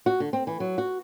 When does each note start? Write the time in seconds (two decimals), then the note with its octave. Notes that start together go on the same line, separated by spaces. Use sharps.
0.06 F#4
0.20 D3
0.33 C4
0.47 E3
0.60 F#3
0.78 F#4